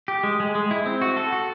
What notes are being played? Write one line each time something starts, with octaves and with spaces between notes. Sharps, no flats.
G4
G#3
G#3
G#3
E4
C4
F#4
A4
F#4